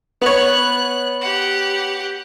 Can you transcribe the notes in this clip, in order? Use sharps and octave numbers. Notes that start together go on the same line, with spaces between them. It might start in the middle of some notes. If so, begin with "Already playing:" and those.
B3 C#5 F#6
G4 F#5